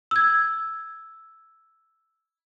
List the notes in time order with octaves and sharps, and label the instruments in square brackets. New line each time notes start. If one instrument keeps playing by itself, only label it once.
[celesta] E6 G#6